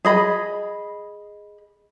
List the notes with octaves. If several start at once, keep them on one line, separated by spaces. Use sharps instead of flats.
G#4 D#5 B5